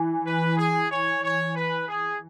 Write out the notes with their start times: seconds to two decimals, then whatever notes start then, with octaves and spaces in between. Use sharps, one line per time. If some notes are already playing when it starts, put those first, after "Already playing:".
Already playing: E3
0.25 B4
0.57 G#4
0.90 C#5
1.22 C#5
1.55 B4
1.88 G#4